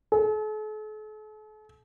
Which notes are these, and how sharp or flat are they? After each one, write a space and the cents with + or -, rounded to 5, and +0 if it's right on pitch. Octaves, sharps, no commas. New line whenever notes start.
A4 -45